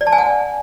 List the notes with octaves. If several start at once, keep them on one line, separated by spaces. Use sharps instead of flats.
D5
A5
G#5
F#5